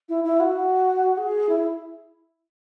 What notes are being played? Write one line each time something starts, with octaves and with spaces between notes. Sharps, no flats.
E4
E4
F#4
G#4
E4